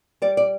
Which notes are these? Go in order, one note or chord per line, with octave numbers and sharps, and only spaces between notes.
G3 D5
D5